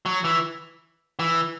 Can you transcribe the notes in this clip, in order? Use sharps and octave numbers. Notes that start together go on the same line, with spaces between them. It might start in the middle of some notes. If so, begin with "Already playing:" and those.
F#3
E3
E3